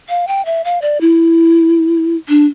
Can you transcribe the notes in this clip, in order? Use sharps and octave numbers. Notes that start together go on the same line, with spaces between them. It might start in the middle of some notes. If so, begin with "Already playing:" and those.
F5
G5
E5
F5
D5
E4
D4